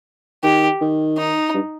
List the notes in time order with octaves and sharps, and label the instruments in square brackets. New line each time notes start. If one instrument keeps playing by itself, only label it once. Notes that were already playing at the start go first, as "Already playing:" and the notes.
[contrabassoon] D#3 [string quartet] G4
[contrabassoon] D#3
[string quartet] D#4
[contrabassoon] G2